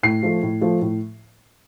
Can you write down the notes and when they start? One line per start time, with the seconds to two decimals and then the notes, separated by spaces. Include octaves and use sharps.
0.03 A2 C7
0.23 F3 A3
0.43 A2
0.61 F3 A3
0.81 A2